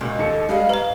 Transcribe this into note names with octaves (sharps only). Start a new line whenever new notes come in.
C#2 A#2 G#3 F#4
D#2 A4 C#7
G3 G#3 G#4 D#5 F5 F#5
G#2 B4 D#5 A#5